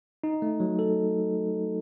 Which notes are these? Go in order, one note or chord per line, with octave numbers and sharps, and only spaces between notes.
D#4
A3
F#3
A4